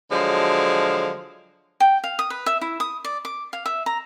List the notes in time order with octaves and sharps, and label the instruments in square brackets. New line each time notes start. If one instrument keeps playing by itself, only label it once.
[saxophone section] D3 F3 F#3 G#3
[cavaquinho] G5
F5
D#6
B4
E5
E4
D#6
D5
D6
F5
E5
A#5